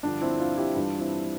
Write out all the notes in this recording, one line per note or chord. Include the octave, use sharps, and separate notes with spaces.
G2 D3 F3 D4
C4 E4
D4 F4
E4 G4
G2 E3 G3 D4 F4
C4 E4